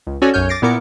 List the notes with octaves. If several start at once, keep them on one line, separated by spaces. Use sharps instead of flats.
C#2
C#4 F#4 A4 C#5 D5 G#5
B1 F#2 C#5 G#5 F6 G6
D6 A6 A#6 C7 D7
A#2 B3 E4 A#4 D6 C#7